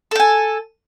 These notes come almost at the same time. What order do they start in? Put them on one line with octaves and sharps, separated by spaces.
A4 G5 G#5